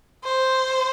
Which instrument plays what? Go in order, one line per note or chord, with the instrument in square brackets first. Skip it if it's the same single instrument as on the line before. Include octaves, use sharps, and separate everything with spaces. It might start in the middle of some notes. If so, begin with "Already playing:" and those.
[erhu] C5